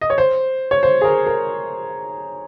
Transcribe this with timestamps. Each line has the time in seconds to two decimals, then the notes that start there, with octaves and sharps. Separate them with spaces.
0.01 D#5
0.10 C#5
0.18 C5
0.71 C#5
0.83 C5
1.01 G#4
1.05 A#4
1.27 A#4